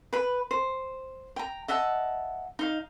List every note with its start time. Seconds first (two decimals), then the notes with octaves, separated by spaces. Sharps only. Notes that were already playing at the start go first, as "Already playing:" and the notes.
0.13 B4 B5
0.51 C5
1.36 G5 A#5
1.68 D#5 E5 F#5 A5
2.59 D#4 F5